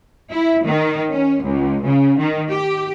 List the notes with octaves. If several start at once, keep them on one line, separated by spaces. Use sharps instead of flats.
E4
D#3
C#4
C#2
C#3
D#3
G4